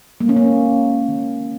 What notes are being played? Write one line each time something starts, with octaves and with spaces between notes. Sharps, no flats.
G#3 A#3
C#4
A#3
G#3
D#3